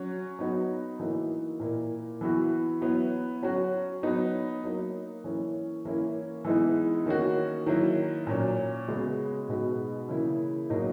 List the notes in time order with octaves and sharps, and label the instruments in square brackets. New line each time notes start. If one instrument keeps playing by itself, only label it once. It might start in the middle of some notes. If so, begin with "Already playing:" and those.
Already playing: [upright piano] F#3 C#4 F#4
F#3 B3 D#4 F#4
E3 A#3 D#4 F#4
A#2 A#3 E4
E3 B3 F#4
F#3 B3 E4
F#3 C#4 F#4
F#3 B3 D#4
F#3 A#3 D#4
E3 A#3 C#4
E3 A#3 C#4 E4
E3 G#3 B3 D#4
D#3 A#3 C#4 F#4
D#3 F#3 A#3 E4
A#2 F#3 C#4
C#3 G#3 B3 F#4
B2 G#3 B3 D#4 F#4
C#3 E3 A#3 E4
B2 F#3 A#3 D#4